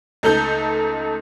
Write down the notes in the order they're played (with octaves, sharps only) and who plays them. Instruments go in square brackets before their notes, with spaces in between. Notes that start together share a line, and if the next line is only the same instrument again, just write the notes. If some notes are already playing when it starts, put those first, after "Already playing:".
[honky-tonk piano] C#2 A3 D#4 A4 G6